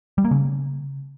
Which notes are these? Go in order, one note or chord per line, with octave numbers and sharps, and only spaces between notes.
G3
A#3
C#3